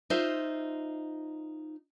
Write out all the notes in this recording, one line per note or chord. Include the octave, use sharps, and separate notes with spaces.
D#4 F4 C5 E5